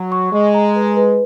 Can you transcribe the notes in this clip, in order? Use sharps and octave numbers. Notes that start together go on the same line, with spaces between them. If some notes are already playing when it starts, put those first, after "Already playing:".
Already playing: F#3
C#6
G#3 D#5
A#5
B4
B4